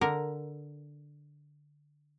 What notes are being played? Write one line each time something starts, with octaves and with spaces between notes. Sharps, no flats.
D3 A#4